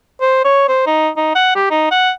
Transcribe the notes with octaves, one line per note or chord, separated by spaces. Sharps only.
C5
C#5
C5
D#4
D#4
F#5
G4
D#4
F#5